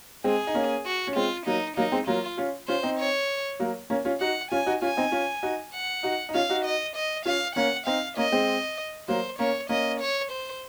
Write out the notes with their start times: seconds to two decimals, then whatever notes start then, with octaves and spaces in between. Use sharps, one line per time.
0.24 G#3 C4 G#4
0.47 D#4
0.55 A#3 C#4
0.86 F#4
1.07 C#4
1.16 G#3 C4 F4
1.46 F#3 A#3 D#4
1.76 F#3 A#3 D#4
1.92 G#3 C4
2.07 F#3 A#3 F4
2.37 C#4 F4
2.68 C#4 F4 C5
2.83 C4 D#4
2.99 C#5
3.59 F#3 A#3
3.90 A#3 C#4
4.05 C#4 F4
4.20 D#4 F#4 F#5
4.51 C#4 F4 G#5
4.66 D#4 F#4
4.82 C#4 F4 G#5
4.97 C4 D#4
5.12 C#4 F4
5.43 D#4 F#4
5.73 F#5
6.03 D#4 F#4
6.29 D#4
6.34 C#4 F4 F5
6.50 D#4 F#4
6.65 D#5
6.96 D#5
7.26 C#4 F4 F5
7.56 A#3 C#4 F#5
7.86 C4 D#4 F5
8.17 A#3 C#4 D#5
8.32 G#3 C4
9.08 F#3 A#3 C5
9.39 A#3 C#4 C#5
9.69 A#3 C#4 D#5
10.00 C#5
10.31 C5